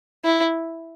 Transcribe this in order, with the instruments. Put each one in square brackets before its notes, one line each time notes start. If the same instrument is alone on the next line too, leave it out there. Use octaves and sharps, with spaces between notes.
[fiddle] E4